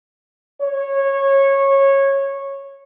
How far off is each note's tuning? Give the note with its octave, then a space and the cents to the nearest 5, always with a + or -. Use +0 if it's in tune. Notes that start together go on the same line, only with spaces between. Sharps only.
C#5 -15